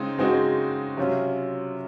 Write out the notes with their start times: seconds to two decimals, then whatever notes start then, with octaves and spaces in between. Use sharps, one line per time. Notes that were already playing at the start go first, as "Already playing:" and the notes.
Already playing: C#3 G#3 C4 D#4
0.18 C#3 G#3 C4 D#4 F#4
0.97 C3 F#3 C#4 F4